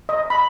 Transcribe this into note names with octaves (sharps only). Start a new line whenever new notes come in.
D#5
B5